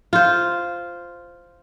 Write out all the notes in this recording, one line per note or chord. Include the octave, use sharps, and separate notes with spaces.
F4 C5